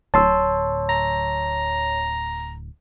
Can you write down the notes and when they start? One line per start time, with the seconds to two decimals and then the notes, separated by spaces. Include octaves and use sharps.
0.14 D1 C#5 A5 C6 E6
0.89 A#5